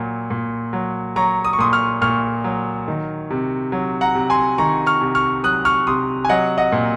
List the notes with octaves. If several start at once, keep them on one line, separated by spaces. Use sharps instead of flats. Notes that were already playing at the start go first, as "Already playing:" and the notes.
Already playing: A#2 F#3
A#2
F#3
F#3 A#5 C#6
D#6
C#6
A#2 C6 D#6
C#6 F6
A#2 C#6 F6
F#3
D#3
C3
F#3
F#5 A#5
C3
G#5 C6
D#3 A#5 C#6
C#6 F6
C3
C#6 F6
F#3 D#6 F#6
C#6 F6
C3 C6 D#6
G#5
F#3 D#5 F#5
D#5 F#5
A#2